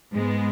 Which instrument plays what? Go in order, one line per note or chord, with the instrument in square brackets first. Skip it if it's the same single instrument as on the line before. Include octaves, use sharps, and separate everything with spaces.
[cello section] G#2 G#3 B3